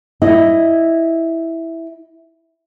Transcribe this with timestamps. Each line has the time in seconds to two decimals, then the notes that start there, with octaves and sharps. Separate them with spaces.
0.22 E4 D#5